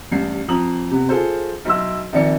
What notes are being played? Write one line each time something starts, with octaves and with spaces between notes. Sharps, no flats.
A1 G2 C7
F2 A#5 D#6 F#7
C3 B3
F4 G#4 A4 C5
B1 E4 C6 E6
A#1 F2 D#3 D5 C#7